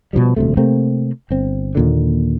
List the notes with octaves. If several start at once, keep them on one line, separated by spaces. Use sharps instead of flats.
B2 D#3 F3 G3
D#1 D2 C3 A3
C3 A3 A#3 C4
G1 C4
D#2 A#2 D3